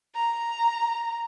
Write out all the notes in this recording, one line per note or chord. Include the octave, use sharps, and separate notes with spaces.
A#5